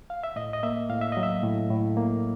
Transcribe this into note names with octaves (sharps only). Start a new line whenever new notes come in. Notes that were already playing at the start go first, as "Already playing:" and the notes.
F5
E5
A2 D#5
D#5
A#3 E5
A2 F5
E5
F#3 D#5
E5
A2
A2
A#3